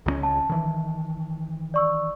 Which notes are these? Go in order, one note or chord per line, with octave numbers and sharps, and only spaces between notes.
C#2 F#3 C#4
A5
D#3 E3
D5 C#6 E6